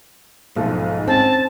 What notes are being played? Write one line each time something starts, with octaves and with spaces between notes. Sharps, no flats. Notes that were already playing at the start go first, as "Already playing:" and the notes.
B1 G#2 F3 A3
C4 C#4 G#5 A5 A6